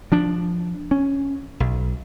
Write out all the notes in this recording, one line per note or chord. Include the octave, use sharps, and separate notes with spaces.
F3 D4
C#4
B1